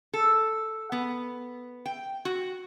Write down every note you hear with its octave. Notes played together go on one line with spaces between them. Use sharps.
A4
B3
G5
F#4